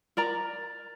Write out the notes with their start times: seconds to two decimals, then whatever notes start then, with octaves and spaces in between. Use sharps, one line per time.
0.17 A#4 D5 A#5